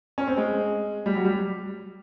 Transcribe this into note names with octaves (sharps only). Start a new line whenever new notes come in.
C#4
C4
G#3
G3
F#3
G3